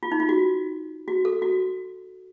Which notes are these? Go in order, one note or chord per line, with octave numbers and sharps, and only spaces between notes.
F4
D#4
F4
F#4
F#4
A4
F#4